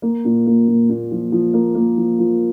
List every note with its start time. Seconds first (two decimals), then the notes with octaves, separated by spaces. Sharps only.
0.02 A#3
0.25 A#2
0.46 A#3
0.67 A#2
0.89 A#2
1.11 F3
1.32 F3
1.54 A#3
1.75 A#3
1.97 F3
2.19 F3